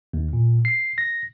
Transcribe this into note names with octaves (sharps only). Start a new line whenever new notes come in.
D#2
A#2
C7
A#6